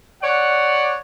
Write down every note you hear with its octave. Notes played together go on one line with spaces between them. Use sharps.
C#5 D5 F#5